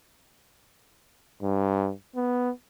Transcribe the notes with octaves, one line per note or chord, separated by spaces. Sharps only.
G2
B3